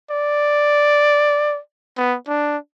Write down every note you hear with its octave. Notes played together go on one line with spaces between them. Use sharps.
D5
B3
D4